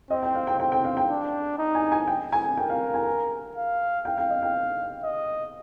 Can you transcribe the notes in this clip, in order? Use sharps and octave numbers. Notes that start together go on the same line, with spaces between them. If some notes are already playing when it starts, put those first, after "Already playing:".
C4 D#5
G5
F5
G5
C4 G5
G5
F5
G5
D4
D#4
G#5
G#5
G5
G#5
A#4 G5
F5
G#5
F5
F5 G5
G5
D#5
G5
D#5